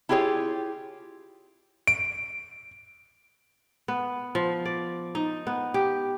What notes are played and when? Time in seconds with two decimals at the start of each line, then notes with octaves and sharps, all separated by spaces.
0.09 E4 F4 G4 G#4 C#5
1.87 D7
3.88 B3
4.35 F3
4.65 D5
5.15 D#4
5.47 B3
5.74 G4